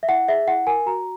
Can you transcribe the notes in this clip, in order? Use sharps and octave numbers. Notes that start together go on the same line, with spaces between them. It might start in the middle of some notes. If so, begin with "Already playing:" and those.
E5
E4 F#5
G#4 E5
E4 F#5
A#4 G#5
F#4 A#5